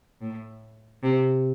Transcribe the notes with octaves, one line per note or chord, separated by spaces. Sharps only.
A2
C3